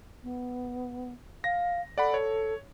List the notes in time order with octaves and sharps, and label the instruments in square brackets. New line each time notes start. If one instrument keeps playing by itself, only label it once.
[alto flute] B3
[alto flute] F5 [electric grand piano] A#6
[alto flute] A4 [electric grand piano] D5 F#5 B5
[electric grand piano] C#5